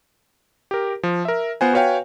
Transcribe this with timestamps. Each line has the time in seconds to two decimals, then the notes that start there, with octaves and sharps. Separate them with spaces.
0.71 G4 A#4
1.03 F3
1.25 A#4 E5
1.61 B3 F4 C5 F#5 G#5
1.73 F#4 B4 C#5 F5 G5 G#5